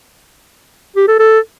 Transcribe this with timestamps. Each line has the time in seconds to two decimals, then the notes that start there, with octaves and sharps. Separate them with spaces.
0.96 G4
1.08 A4
1.19 A4